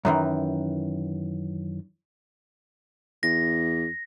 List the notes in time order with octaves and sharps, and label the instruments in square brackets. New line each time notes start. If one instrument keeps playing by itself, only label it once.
[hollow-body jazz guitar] F#2 D#3 E3
[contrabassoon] E2 [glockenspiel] A#6